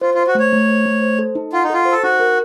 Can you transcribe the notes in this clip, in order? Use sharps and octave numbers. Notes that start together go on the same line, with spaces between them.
F4 C5
F4
C5
F#4
A3 C#5
A3
C5
A3
C5
A4
D#4
F4 F#5
D#4
F4 A4
C5
A4
D#4 F#4
A#4